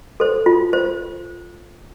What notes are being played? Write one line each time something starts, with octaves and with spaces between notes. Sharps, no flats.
A4 C5
F4
C5